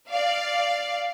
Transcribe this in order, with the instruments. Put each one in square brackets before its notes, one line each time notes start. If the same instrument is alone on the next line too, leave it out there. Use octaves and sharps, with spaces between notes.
[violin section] D5 F5